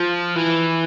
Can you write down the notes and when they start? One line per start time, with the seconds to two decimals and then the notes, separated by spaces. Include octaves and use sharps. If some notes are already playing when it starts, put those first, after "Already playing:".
Already playing: F3
0.35 E3